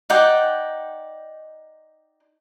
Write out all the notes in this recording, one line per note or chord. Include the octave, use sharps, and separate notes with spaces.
D#4 D5 F#5 G5